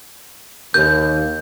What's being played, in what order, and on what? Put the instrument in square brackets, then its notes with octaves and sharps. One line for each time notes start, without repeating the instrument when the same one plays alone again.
[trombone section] D#2 [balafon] A#4 [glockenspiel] G6